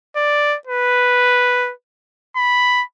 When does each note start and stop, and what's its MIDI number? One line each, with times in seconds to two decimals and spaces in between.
0.17 0.57 74
0.67 1.72 71
2.36 2.83 83